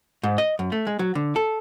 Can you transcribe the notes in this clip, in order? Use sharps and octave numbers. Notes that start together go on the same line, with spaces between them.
G#2
D#5
F#2
A3
G#3
F#3
D3
A4